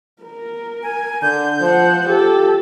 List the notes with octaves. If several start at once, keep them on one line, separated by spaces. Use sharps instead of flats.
A#4
G#5
D3 G6
F3 C5 F#5
F4 G4 A4